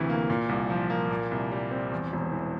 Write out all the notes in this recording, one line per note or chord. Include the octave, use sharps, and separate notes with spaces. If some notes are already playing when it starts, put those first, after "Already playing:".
Already playing: D2 C3 E3
A#3
A#2
C2
F3
A#3
A#2
C2
G3
C4
E2
E1
E3